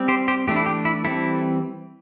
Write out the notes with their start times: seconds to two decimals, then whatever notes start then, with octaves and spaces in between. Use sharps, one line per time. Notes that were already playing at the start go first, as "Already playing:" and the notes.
Already playing: G3 C4
0.08 G4 C5
0.28 G4 C5
0.47 E3 A3 D4 G4
0.56 E4
0.66 G4
0.85 E4
1.04 E3 G3 C4 E4 A4